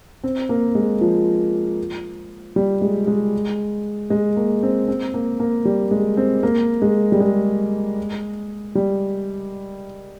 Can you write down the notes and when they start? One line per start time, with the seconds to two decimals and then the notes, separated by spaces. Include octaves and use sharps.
0.24 C4
0.49 A#3
0.75 G#3
1.01 F3
2.56 G3
2.81 G#3
3.07 G#3
4.10 G#3
4.37 A#3
4.63 C4
4.88 C4
5.14 A#3
5.40 A#3
5.65 G3
5.91 G#3
6.17 C4
6.43 A#3
6.82 G#3
7.12 G3
7.20 G#3
8.75 G3